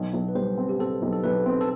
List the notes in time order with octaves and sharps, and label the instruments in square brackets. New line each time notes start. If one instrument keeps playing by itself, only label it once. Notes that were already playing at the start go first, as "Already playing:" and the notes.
Already playing: [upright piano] B1
B1
[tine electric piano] B4
[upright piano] G3 [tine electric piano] C5
[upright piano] C4
[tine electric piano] G4
[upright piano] C4 [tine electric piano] A4
[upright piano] B1
[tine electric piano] A4
[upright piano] B1 [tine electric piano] B4
[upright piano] C4
[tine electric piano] A4